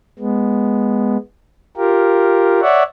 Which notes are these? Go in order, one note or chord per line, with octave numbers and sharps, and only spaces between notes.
G#3 B3
F4 G4 A#4
C#5 D5 E5 F#5